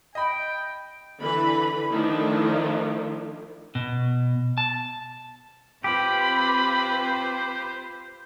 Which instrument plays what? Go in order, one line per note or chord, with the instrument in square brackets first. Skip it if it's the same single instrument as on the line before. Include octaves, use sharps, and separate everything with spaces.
[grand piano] D#5 B5 [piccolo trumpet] G5
[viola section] D3 E3 B4 B5
D#3 F3 A3 D4 E4
[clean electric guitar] B2
A5
[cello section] C4 F4 B4 [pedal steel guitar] G4 [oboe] C5 [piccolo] B5